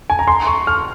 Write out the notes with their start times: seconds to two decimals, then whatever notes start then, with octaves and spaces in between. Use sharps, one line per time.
0.10 G#5
0.19 A#5
0.28 C6
0.47 C#6
0.67 F6